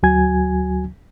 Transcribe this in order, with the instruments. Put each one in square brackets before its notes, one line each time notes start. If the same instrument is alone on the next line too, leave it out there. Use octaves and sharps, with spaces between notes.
[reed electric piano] D2 F#3 F#4 G#5 G#6